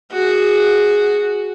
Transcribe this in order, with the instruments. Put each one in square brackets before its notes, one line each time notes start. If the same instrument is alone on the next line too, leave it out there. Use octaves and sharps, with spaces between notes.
[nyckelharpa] F#4 G#4